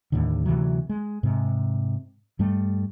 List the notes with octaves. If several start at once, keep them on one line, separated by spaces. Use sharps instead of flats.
D#2 A2 D3
D2 C3 E3 F#3
G#3
G#2 C3
G2 G3 A3